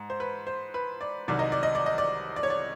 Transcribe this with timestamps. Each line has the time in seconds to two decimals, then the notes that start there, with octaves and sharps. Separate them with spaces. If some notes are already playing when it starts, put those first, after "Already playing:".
Already playing: G#2
0.10 C5
0.20 B4
0.47 C5
0.74 B4
1.01 D5
1.28 C2 C3 D#3 F#3 D5
1.39 D#5
1.52 D5
1.63 D#5
1.75 D5
1.86 D#5
1.98 D5
2.36 D5
2.43 C#5
2.50 D5